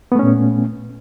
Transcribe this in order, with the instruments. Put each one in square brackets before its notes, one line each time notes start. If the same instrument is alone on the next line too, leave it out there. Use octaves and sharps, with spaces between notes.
[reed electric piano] B3
A3
C#4
A#2